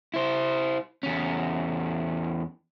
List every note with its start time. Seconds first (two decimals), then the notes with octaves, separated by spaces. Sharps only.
0.14 E4 C5
1.03 E2 C#4